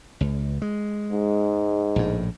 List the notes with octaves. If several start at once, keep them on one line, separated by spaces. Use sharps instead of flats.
C#2
G#3
G#2
A#1 A2